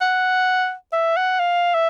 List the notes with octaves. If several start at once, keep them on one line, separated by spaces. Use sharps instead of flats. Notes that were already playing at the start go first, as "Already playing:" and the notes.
F#5
E5
F#5
F5
E5